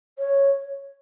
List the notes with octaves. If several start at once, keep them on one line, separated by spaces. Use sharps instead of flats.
C#5